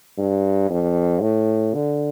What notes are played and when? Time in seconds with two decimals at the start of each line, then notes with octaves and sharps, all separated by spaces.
0.18 G2
0.70 F2
1.22 A2
1.74 D3